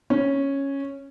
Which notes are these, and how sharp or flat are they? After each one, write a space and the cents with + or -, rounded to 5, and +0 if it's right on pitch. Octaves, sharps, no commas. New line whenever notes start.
C#4 -5